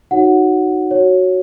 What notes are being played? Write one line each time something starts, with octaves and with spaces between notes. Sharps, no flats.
D#4 F#4 C#5 F#5
F#4 C#5